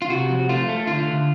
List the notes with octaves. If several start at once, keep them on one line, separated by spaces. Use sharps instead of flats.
F4
C3 F#4
F3
A3 F4
A3
D3 F4
D3